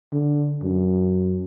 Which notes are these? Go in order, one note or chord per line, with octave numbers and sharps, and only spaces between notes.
D3
F#2